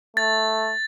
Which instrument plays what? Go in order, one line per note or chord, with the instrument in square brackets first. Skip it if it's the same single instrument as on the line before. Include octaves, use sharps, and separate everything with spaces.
[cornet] A3 [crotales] A6